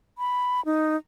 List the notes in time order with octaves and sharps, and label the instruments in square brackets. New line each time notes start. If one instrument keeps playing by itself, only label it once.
[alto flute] B5
D#4